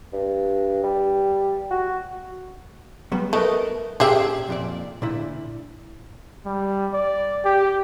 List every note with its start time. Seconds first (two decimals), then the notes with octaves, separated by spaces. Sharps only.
0.13 G2
0.83 G3
1.71 F#4
3.12 F#3 G3 B3
3.33 A3 A#4 B4 D#5
4.00 A#2 C#4 G4 G#4 E5 G5
4.48 F2 A#2 D5
5.02 A#2 D3 E4
6.45 G3
6.93 D5
7.45 G4